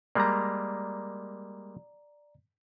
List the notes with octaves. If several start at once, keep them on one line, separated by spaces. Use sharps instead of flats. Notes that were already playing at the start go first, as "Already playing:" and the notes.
G3 G#3 A#3 D5 A#5